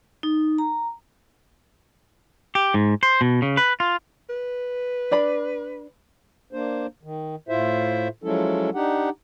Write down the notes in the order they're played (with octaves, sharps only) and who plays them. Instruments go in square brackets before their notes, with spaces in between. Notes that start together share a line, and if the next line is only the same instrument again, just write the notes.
[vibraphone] D#4
A#5
[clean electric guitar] G4
G#2
C5
B2
C#3
B4
F4
[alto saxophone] B4
[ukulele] D4 D5 B5
[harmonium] A#3 D4 C5
D#3
A2 E4 F4 C5 E5
F3 F#3 G#3 C#4 E4 A4
D4 D#4 G4 F#5